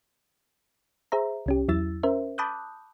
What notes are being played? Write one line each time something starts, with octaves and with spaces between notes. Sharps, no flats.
G#4 C5 E5 A#5
C2 C#4 G4
E2 F#3 E4 E6 A6
C#4 A#4 C5 E5
A5 B5 D6 D#6 F#6 G6